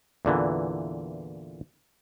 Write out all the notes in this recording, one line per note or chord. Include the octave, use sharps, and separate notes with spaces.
E2 A#2 D3 E3